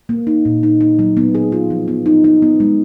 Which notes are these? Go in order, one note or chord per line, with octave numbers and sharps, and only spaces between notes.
A#3
D#4
A#2
D#4
D#4
F#3
B3
G#4
F4
F3
B3
D#4
D#4
B3
G#3